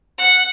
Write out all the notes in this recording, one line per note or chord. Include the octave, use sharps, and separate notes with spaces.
F#5